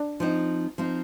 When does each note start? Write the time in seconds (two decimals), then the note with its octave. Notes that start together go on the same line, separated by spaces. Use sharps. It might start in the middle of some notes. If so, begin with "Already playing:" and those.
Already playing: D4
0.20 F3 C4 D#4
0.78 F3 C4 D#4